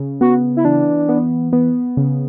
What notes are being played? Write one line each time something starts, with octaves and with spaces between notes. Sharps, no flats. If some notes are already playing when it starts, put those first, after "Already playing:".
Already playing: C#3
B3 F#4
E4
E3 D4
B3
B3
C#3